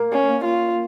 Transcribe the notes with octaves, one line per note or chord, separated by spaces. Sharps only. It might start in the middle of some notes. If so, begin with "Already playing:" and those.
Already playing: A#3
C#4
F4